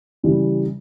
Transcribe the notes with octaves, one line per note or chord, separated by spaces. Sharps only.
C#3 E3 G3